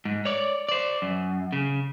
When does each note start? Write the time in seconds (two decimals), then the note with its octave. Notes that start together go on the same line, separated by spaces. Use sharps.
0.05 G#2
0.25 C#5 D5
0.69 C5 D5
1.02 F#2
1.52 C#3